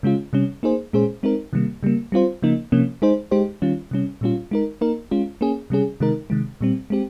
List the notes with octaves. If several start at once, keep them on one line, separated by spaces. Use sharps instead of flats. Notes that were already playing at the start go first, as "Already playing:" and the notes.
C#3 G#3 C#4 F4
C3 G3 C#4
A#3 D#4 G#4 C5
A#2 G#3 C#4 G#4 C5
G#3 C4 D#4 A#4
C3 D#3 G3 A#3
C#3 G3 A#3
G3 C4 F4 C5
C#3 F3 A#3 D#4
C3 F3 A#3 C#4
G#3 D#4 G#4 C5
G#3 D#4 G4 C5
D#3 G3 C#4 F4
C3 G3 C#4
A#2 G3 C#4 F4
G#3 D#4 A#4
A#3 D#4 A#4
G#3 C#4 F4
A#3 C#4 G#4
C3 G3 C#4 G#4
C3 D#3 G#3 D#4 A#4
C3 D#3 G#3
A#2 G3 C4
G#3 C4 G4